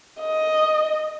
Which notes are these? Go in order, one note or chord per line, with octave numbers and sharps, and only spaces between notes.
D#5